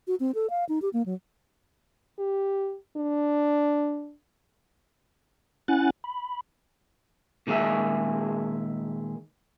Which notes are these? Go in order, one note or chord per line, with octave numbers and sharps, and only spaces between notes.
F#4
C4
A4
F5
D#4
G4
A#3
F#3
G4
D4
C#4 E4 F#5 G#5 F#6 A6
B5
A#2 D#3 G#3 G#4 E5